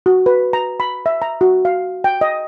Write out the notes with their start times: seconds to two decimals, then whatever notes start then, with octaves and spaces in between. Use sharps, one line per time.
0.06 F#4
0.26 B4
0.53 A#5
0.80 B5
1.06 E5
1.22 A#5
1.41 F#4
1.65 F5
2.04 G5
2.21 D#5